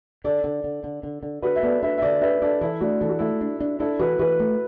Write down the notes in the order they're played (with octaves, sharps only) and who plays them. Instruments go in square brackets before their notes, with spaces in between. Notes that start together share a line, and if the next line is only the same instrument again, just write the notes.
[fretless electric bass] D3 [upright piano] A4 D5
[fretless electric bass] D3
D3
D3
D3
D3
[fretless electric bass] D3 [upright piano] F#4 B4
[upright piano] E5
[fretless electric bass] B3 [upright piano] A4 D5
[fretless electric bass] D4 [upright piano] B4 E5
[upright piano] E5
[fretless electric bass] D3 [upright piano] A4 D5
[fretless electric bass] D4 [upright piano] B4 E5
[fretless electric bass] D4 [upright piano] A4 D5
[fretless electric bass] E3 [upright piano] E4 A4
[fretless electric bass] A3 [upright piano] D4 F#4
[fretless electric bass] E3 [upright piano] A4
[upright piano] F#4
[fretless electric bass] A3 [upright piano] E4 A4
[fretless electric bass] D4
D4
[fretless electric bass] D4 [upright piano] E4 A4
[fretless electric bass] E3 [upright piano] F#4 B4
[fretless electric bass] E3 [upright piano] F#4 B4
[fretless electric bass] A3